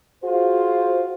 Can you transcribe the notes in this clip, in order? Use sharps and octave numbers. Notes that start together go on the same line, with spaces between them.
F4 F#4 G#4 C5